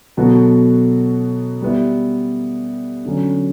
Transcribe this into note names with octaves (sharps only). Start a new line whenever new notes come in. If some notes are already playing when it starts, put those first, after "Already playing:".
B2 F#3 B3 F#4 A4
G3 B3 E4
D3 F#3 C#4